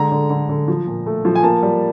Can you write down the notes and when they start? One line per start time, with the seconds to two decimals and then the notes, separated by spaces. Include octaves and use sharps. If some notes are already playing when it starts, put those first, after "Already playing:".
Already playing: D3 G#3 A#5
0.11 D3
0.30 D3
0.49 D3
0.68 F3
0.87 A#2
1.06 A3
1.25 F3
1.35 G#5
1.43 A#3 A5
1.63 G3